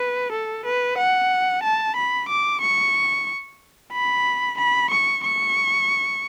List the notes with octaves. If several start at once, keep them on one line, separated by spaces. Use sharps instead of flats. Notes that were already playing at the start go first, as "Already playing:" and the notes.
Already playing: B4
A4
B4
F#5
A5
B5
D6
C#6
B5
B5
C#6
C#6